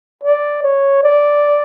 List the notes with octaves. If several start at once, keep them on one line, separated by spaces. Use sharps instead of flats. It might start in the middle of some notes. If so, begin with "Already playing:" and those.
D5
C#5
D5